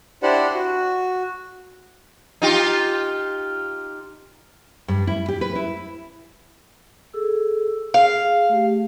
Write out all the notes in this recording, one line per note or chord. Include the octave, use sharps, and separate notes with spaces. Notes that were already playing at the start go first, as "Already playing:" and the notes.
D4 E4 G4 C5 D5 F#5
F#4
D#4 F4 G4
G2
E4
G4
B4
E4
G#4 A4 E6
G#4 F5
G#4
A3 G4